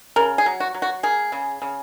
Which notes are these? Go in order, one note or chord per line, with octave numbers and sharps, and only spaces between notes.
C#3 A#4
G#4
F#3
F#4
F#3
F#4
A#3 G#4
C#3
C#3